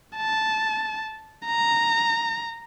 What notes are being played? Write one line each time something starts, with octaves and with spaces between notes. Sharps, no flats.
A5
A#5